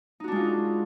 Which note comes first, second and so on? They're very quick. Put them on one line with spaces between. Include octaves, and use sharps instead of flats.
D#4 F#4 D4 G#3 F4